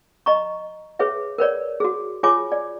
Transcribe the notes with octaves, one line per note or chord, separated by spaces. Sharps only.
D#5 A#5 C#6
G#4 B4 C#5 E5
A#4 B4 C#5 D5
F#4 G#4
F4 G#4 C#5 G#5 D6
D5